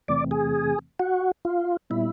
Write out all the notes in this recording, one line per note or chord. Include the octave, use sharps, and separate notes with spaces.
E2 C3 E3 A3 C4 D5
G#4
F#4
F4
A#2 G3 B3 E4